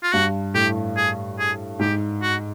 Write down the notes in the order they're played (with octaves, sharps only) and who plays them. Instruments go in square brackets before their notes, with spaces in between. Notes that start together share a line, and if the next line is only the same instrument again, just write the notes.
[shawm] F4
[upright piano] G2 [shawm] F#4
[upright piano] A2 [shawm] G4
[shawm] G#4
G#4
[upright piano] G#2 [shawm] G4
[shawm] F#4